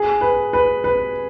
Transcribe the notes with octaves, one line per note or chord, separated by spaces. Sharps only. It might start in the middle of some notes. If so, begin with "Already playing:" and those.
Already playing: G#4
B4
B4
B4